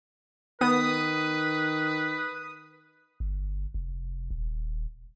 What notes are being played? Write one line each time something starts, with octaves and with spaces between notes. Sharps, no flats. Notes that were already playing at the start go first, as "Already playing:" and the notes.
D#3 B3 B4 D#6
G1
F1
D#1